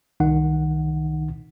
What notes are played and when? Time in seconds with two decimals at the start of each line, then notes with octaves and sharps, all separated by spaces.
0.20 C2 D#3 D#4 F#5